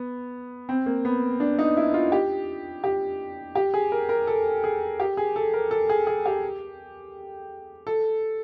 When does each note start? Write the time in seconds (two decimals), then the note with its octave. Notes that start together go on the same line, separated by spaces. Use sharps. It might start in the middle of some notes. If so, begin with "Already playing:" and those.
Already playing: B3
0.69 C4
0.86 A#3
1.05 B3
1.40 D4
1.59 D#4
1.77 E4
1.94 F4
2.12 G4
2.84 G4
3.55 G4
3.74 G#4
3.92 A#4
4.09 A#4
4.27 A4
4.64 G#4
5.00 G4
5.17 G#4
5.36 A4
5.54 A#4
5.71 A4
5.89 G#4
6.07 G#4
6.26 G4
7.87 A4